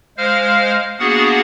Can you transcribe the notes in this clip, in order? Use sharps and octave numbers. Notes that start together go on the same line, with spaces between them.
G#3 C5 F5 F6
A#3 B3 D4 F#4 G#4 F#5